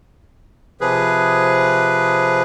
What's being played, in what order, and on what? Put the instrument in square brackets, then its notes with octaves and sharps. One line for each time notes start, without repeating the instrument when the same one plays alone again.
[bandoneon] C3 F3 G#4 B4